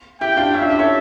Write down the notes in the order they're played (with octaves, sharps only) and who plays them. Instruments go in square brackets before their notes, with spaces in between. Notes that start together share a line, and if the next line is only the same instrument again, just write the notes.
[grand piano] E4 G4 [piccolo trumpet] G5
[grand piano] D4 F4
[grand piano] C#4 E4 [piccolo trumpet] E5
[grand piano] D4 F4
E4 G4
A4 C#5